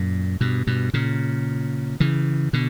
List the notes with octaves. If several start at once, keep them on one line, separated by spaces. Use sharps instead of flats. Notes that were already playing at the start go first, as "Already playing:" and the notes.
Already playing: F#2 A#2
G2 B2
G2 B2
A#2 C#3
C#3 E3
B2 D3